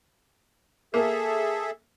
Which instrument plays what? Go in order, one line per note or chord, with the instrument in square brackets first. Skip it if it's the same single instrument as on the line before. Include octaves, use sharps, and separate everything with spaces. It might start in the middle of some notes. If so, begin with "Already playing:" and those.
[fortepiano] A#3 [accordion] G#4 A4 E5